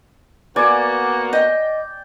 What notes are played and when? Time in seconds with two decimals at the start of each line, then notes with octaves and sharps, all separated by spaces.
0.56 A#3 B3 F#4 D5 G#5 D6
1.33 D#5 G5